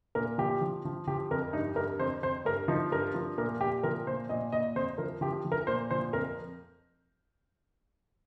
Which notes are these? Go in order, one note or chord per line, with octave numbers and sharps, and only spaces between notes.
A#2 A#4
F3 G4
F3
F3
F3 G4
F2 A#4
G2 D#4
G2 A#4
F2 C5
F2 C5
G2 A#4
F3 D#4
G2 A#4
F3
A#2 A#4
A#2 G4
F3 A#4
A#2 C5
A#2 D#5
A#2 D#5
F2 C5
F3 A#4
F3 G4
F3
A#4
A#2 C5
F3 C5
F2 A#4